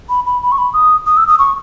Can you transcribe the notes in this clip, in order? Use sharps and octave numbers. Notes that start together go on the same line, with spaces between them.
B5
B5
B5
C#6
B5
D#6
D#6
E6
D#6
C#6